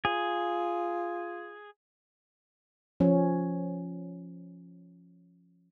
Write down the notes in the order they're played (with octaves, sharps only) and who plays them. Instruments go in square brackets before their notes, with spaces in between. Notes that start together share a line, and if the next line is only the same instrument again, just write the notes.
[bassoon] F4 [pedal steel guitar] G#4
[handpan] F3 C#4